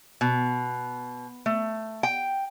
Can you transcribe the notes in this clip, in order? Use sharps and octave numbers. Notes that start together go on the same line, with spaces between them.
B2
A3
G5